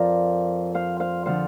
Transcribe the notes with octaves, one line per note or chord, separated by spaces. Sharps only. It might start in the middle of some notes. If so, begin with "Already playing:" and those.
Already playing: F2 F3 A#4 C5 D5 F5
C5 F5
C5 F5
D3 F3 C5 F5